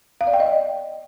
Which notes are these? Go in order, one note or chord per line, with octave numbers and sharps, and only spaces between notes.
F5
D5
G5
D#5